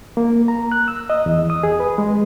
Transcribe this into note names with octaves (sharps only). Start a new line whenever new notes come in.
A#3
A#5
F#6
E6
D#5
E2
D#6
G#4
B4
G#3